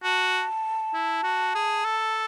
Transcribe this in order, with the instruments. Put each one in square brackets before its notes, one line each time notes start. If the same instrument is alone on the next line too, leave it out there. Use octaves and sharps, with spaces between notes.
[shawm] F#4 [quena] A5
[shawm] E4
F#4
G#4
A4